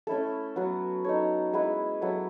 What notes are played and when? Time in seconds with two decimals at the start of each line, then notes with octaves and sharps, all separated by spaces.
0.07 A3 C#4 E4 A4
0.56 F#3 B3 F#4
1.04 D#4 A4 C#5
1.53 G#3 B3 E4 B4
2.01 F#3 B3 E4 A4